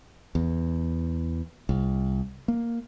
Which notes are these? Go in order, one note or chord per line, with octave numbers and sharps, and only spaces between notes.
E2
C2
A#3